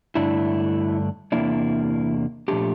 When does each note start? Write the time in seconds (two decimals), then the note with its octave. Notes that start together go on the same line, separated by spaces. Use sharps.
0.15 G2 D3 A3 D4 E4
1.32 E2 C3 E3 A#3 D4 E4
2.48 A#2 F3 A3 D4 G4